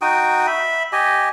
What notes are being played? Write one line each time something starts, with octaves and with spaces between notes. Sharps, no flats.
D#4 F#4 G5 D#6
E5 B5
G4 D#5 G#5